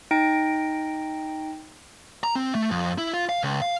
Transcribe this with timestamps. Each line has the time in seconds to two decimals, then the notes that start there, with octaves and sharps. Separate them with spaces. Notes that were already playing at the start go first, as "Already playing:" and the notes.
0.11 D#4 G5 A#6 D7
2.24 A#5
2.35 C4
2.55 A3
2.71 F2
2.98 E4
3.14 F4
3.29 F5
3.44 C#2
3.62 F5